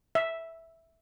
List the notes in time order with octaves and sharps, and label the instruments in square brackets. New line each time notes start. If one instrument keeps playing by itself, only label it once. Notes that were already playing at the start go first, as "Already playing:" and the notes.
[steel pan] E5